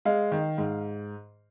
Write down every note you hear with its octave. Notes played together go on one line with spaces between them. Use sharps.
G#3 F5
D#3
G#2